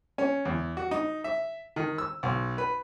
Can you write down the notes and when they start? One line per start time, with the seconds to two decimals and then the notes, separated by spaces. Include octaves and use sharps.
0.18 C#4
0.45 E2
0.77 F#4
0.91 D#4
1.24 E5
1.76 D#3
1.98 E6
2.23 B1
2.58 B4